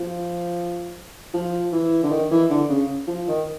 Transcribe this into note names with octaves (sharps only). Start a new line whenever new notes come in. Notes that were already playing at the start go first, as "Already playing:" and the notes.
Already playing: F3
F3
E3
D3
D#3
E3
D3
C#3
F3
D#3